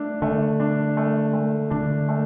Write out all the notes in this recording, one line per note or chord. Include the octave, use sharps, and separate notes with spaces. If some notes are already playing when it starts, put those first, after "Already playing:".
Already playing: A3 D4
D3 A3
D4
A3
A3
D3 D4
A3